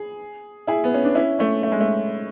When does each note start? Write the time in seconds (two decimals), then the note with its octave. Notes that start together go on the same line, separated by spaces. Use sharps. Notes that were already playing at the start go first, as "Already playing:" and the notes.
Already playing: G#4
0.67 E4 G#4
0.84 B3
0.94 C#4
1.04 D4
1.15 C#4 E4
1.39 A3 C#4
1.63 A3
1.72 G#3
1.81 A3